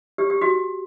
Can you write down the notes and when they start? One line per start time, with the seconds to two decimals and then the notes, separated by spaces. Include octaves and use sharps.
0.18 G4
0.30 G4
0.41 F#4